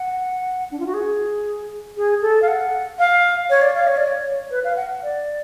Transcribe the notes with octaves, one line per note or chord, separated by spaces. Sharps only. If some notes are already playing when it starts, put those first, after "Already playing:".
Already playing: F#5
D4
F4
F#4
G#4
G#4
A4
F5
F#5
F5
C#5
D5
F5
C#5
D5
C#5
B4
F5
F#5
D5